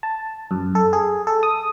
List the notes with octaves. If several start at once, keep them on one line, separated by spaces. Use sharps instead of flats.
A5
F#2
A4
G#4
A4
D#6